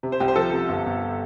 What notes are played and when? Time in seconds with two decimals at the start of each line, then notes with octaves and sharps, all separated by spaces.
0.03 C3
0.12 C5
0.20 C2 G4
0.28 C5
0.36 F3 A4
0.53 C3
0.68 G1
0.86 G1